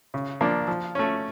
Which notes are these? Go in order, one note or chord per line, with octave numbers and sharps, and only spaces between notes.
C#3
F3 A#3 D4
F3
A3 C#4